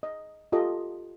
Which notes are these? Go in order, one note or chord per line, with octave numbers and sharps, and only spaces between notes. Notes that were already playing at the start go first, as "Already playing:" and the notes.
D#5
F4 G4 A4 D#5